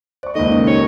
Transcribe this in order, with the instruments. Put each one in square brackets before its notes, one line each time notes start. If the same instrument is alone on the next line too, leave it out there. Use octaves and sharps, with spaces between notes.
[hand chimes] C5 [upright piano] D5 C#6
[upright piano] C#2 A#2 D#3 [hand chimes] A4 [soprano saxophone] D#5
[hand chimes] C#4 D#4 A#4
[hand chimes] G4 [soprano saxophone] C#5